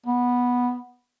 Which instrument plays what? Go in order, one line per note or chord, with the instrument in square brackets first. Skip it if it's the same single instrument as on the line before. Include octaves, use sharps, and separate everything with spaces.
[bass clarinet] B3